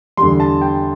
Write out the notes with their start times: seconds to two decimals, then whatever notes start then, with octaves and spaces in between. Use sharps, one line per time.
0.17 E2 D3 G3 C6
0.40 A5
0.62 G5